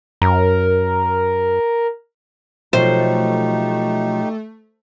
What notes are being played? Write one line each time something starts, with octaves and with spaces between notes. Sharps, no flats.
F#2 A#4
B2 F3 F#3 A3 D#4 G4 C5